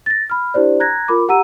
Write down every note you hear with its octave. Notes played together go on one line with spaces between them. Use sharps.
A6 A#6
B5 F6
D4 E4 G4 C5 D5
A#5 F#6 G#6 A#6
F4 A#4 B5 D6
G4 F#5 A#5 E6 D#7